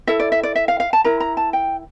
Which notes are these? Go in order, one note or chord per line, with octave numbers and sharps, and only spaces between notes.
E4 A4 E5
D5
E5
D5
E5
F5
F5
A5
E4 A#4 A#5
A#5
A5
G5